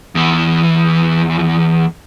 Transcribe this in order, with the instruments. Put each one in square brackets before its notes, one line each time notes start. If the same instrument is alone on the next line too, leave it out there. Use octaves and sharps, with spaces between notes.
[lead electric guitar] E2 E3